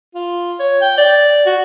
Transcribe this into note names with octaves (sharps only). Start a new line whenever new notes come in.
F4
C#5
G5
D5
F#4